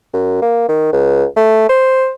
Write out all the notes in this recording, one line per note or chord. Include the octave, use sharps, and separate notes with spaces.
F#2
A#3
D#3
C#2
A3
C5